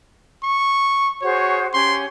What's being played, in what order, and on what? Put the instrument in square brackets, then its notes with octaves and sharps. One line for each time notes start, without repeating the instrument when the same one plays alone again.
[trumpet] C#6
[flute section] F#4 G#4 C5 [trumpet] C#5
[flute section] C#4 G4 [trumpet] C6